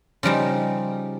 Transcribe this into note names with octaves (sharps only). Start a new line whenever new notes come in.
C#3 F3 G3 D#4